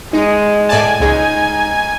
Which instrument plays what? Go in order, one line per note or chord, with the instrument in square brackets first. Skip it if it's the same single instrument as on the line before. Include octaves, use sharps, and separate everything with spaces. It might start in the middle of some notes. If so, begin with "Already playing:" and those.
[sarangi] G#3 [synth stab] D#4
[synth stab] A2 D5 A5 [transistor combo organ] G#5
[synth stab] C#2 G#3 [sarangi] D#4